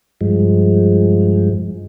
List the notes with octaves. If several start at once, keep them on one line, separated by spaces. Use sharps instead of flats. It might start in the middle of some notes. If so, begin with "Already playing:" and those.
G2 F3 G#3